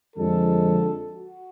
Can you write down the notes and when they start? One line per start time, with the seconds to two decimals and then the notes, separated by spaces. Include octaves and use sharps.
0.16 F2 D3 F3 G#3 A4
1.13 F#4